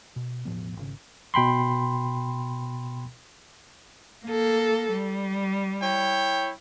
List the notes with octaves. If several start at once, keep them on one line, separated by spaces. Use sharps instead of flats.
B2
E1 A2 F3 B3
G#1 C#3
B2 G5 B5 C6
A#3 A4
G3
E4 C#5 G5